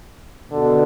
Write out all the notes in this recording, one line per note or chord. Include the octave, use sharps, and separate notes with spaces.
B2 D3